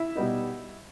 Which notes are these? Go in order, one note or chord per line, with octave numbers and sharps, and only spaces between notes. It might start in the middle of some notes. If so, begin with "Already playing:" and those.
Already playing: E4 E5
B2 G3 B3 D#4